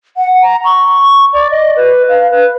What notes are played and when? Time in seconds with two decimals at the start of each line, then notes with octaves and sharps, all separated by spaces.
0.17 F#5
0.42 A#5
0.65 C#6
1.33 D5
1.51 D#5
1.76 B4
2.09 F5
2.31 B4